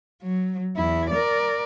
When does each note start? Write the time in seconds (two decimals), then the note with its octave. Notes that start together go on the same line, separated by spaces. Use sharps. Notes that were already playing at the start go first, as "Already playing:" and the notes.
0.22 F#3
0.76 E2 E4
1.10 A#4 D5